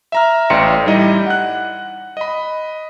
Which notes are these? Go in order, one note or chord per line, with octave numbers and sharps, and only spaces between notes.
E5 A#5 F6
A1 A3 D5 G5 C6 C#7
G3 D#4 E4 D5 D#5
F#5 F#6
D#5 B5